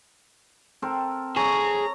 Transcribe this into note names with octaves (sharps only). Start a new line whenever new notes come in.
C4 A4 A#4
G#4 C#5 A#5